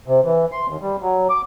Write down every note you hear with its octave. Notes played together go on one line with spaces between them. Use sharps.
C3
E3
C6
D#2
G3
F#3
D6